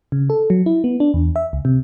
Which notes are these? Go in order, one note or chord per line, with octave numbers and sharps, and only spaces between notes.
C#3
A4
F#3
E4
B3
D4
E2
E5
C#2
C3